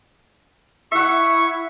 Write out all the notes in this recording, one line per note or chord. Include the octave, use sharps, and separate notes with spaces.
E4 E5 F#5 C#6